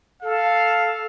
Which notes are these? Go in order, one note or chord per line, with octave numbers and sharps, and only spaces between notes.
A4 F5